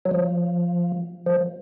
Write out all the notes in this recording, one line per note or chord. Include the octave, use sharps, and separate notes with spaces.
F#3
F3
F3